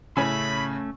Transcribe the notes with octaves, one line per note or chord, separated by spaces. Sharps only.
A2 C#3 A3 C#4 A4 C#5 G#5 B5